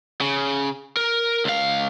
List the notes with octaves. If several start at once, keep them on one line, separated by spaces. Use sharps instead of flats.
C#3
A#4
C#2 F5